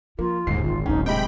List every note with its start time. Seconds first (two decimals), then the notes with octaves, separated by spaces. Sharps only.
0.19 F3 A#3 F4
0.47 D#1 D#2 G#2 D3 C7
0.64 G#1 F4
0.86 D1 F#3 C#4 D#4
1.06 C3 G#3 D#5 G5 B5